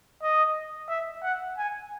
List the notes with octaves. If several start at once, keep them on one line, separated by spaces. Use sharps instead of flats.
D#5
E5
F#5
G#5